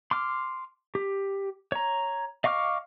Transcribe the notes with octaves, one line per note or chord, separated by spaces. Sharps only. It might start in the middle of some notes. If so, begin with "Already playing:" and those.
C6 D6 F6
G4
C#5 A#5
D#5 F5 C#6 D6 F6